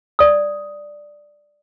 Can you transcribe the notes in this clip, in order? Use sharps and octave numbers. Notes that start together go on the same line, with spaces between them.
D5 D#6